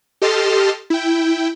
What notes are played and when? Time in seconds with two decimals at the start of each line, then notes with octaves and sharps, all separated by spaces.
0.22 G4 A4 D#5 A5 C6 F6
0.90 E4 G5